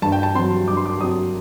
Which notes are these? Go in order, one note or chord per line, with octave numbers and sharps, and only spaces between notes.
G2 A5
G5
A5
F#3 C4 C6
G2 D6
C6
D6
F#3 C4 D#6